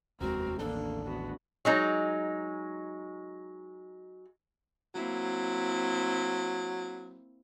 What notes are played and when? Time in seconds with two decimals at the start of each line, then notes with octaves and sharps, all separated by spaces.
0.21 F1 D#2 G#3 C4 F#4 A#4
0.59 A1 D#2 A#3 D4 A4
1.06 B3 F#4
1.65 F#3 G#3 D#4
4.95 F#3 A#3 C4 E4